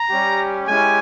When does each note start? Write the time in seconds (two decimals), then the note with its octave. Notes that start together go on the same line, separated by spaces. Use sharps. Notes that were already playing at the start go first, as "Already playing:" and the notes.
Already playing: A#5
0.10 G3 C#4 G4
0.67 G#3 C#4 E4 G4 G#5